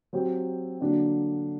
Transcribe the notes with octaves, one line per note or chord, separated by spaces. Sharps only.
F#3 C4 G4
D3 F#3 A#3 D4